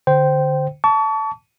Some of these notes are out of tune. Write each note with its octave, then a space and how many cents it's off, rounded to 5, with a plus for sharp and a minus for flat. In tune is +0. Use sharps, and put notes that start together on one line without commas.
D3 +0 C5 -5 G5 -20
A5 +0 C#6 +40